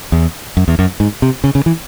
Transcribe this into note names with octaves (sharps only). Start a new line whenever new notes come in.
E2
F#2
E2
F#2
G#2
C3
C#3
C#3
E3